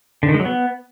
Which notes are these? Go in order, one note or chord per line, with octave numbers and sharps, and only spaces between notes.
D3
D#3
G#3
F#3
B3